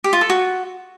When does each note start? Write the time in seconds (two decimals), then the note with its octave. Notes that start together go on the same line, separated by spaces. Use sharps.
0.04 G4
0.13 F4
0.21 A4
0.30 F#4